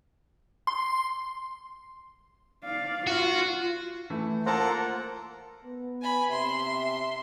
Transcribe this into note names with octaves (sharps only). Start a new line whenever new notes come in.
C6
D5 F5
F4 F#4
E3 A3 E4
A#3 F4 A4 A#4 C5 F#5 A5 A#5
B3
G#5 B5
C3 E5 C6